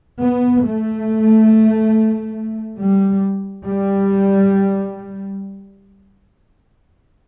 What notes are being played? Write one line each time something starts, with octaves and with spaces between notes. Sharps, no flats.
B3
A3
G3
G3